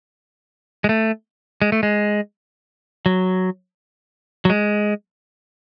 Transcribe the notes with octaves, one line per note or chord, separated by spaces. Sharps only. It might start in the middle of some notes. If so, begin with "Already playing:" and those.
G#3
A3
G#3
A3
G#3
F#3
F#3
G#3